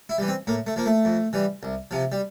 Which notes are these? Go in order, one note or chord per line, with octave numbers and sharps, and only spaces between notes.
E4
E3 G3
C4
A2 A#3
A3
F3 A#3
A3
F2
E3 G3
C2
C3 F3
G3